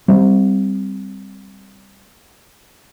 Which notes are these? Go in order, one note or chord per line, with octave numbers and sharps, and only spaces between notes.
G3 C4